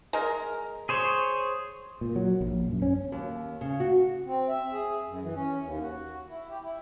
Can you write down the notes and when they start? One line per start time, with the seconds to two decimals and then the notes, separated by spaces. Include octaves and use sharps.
0.13 G#3 A#4
0.89 G#4 C5 C#5
2.01 A#2
2.16 F#3
2.41 A#1
2.70 F#2
2.82 C#4
3.12 D#2
3.61 C#3
3.80 F#4
4.26 C4
4.49 E5
4.73 G#4
5.07 F#2
5.22 E3
5.34 C#4
5.62 D#2
5.81 F#4
6.29 E4
6.49 G4
6.62 E4